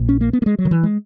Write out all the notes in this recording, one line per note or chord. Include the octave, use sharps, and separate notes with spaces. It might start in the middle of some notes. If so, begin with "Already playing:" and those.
Already playing: A#1 A#2
C#4
A#3
B3
A#3
G#3
F#3
D#3
E3
G#3